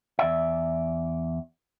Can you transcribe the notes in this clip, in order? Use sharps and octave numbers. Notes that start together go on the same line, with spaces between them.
E2 D5 E5